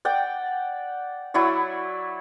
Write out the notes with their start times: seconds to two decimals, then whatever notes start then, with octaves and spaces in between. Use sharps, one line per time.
0.05 D5 F#5 G5
1.34 F#3 E4 D5 C#6